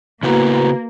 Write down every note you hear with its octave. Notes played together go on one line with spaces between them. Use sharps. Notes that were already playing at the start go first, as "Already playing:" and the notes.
C#3 A#3 B3 E4 F#4 B4 A#5